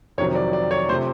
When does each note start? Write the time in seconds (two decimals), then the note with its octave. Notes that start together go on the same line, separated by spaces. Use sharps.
0.18 F2 C3 D#3 F#3 C#5
0.35 D5
0.53 D5
0.71 C#5
0.89 C3 F3 A3 C5